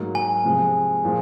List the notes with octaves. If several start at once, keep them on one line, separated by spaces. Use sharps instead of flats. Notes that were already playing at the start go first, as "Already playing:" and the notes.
Already playing: G#2 F#3 A#3 D#4 A#4
G#5
C3 F3 G#3
A#2 F3 G#3